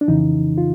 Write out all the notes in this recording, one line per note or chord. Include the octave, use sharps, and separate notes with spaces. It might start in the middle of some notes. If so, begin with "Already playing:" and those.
D4
F2 C#3 E3 D#4
F4